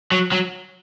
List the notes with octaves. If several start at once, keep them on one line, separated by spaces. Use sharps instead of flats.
F#3
F#3